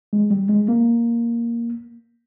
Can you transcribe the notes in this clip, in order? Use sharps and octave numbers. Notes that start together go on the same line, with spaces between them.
G#3
G3
G#3
A#3